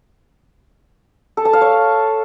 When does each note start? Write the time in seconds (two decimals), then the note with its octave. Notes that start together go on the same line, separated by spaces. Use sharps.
1.37 A4
1.45 A5
1.53 F5
1.61 C#5